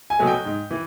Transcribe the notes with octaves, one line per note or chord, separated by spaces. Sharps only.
G#5
B2 F#3 A3
G5
G#2
E3